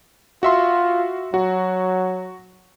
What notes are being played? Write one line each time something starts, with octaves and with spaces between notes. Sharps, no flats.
F4 F#4 E5 C6
F#3 F#4